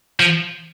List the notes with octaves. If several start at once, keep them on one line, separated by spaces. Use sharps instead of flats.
F3